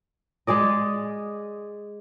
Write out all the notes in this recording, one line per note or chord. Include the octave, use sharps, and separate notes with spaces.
G#3 G#4 D5 D#5